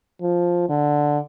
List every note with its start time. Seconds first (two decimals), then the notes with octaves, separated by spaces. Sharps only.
0.22 F3
0.69 D3